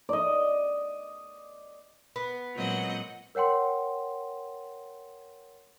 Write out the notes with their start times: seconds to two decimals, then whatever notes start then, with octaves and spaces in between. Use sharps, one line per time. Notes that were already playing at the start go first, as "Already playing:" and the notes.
0.09 D5 D#5
2.16 B3
2.55 A#2 F#3 G#3 C4 D#5 F#5
3.35 A#4 C#5 F#5 G5 C6